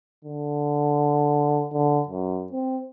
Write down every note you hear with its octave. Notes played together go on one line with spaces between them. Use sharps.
D3
D3
F#2
C4